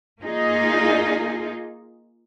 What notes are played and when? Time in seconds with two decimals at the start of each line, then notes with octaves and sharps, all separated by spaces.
0.21 A#3 D#4 F4 G#4